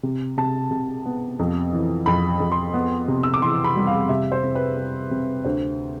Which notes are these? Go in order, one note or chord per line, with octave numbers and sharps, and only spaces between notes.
C3
C3 A5
C3
B3
F2
E3
F2 B5
F2
C6
B3
C3
E6
D6
E3 C6
B5
G3
F5
C3 E5
C5
C3
B4
C4
C3
D2 C5